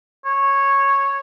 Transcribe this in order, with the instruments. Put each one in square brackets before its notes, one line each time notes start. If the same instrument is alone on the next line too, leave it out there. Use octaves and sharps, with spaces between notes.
[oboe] C#5